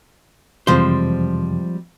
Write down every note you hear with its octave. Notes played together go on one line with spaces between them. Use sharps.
F2 C3 E3 F3 G3 G#3 C4 C5